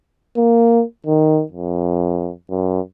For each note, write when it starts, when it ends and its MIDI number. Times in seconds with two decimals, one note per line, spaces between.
0.37 0.84 58
1.07 1.43 51
1.52 2.31 41
2.51 2.80 42